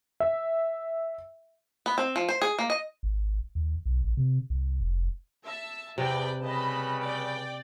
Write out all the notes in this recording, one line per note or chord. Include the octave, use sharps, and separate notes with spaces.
E5
B3
C4
F3
C5
G#4
A#3
D#5
G#1
D#2
B1
A1
C3
C2
F1
E5 A5
E2 C3 B4 D5 G5
C#3 G3 B4 D#5 A5 B5
D5 G5